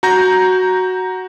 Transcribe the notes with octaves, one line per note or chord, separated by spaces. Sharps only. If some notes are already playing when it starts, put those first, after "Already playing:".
F#4 A#5 G6 A#6